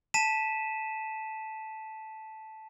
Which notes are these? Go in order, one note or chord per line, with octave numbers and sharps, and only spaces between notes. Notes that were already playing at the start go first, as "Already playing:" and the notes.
A5 B6 D#7 E7